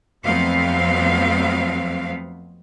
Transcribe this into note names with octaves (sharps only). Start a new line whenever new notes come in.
F2 F#3 A3 B3 C4 F5